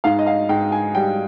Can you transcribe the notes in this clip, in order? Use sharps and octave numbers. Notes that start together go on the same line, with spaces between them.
G#2 F5
D#5
F5
G#2 G5
G#5
G3 G5